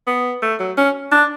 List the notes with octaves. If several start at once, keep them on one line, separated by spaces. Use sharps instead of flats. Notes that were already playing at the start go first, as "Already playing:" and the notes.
B3
A3
F#3
C#4
D4